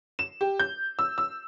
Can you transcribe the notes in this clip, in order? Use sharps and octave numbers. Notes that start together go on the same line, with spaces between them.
E7
G4
G6
E6
E6